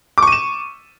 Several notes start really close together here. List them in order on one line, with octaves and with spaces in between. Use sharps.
D6 C#6 D#7 E7